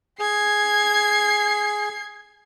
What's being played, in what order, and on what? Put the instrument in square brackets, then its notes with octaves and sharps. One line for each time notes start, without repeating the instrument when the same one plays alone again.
[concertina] G#4 [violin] G#6 C7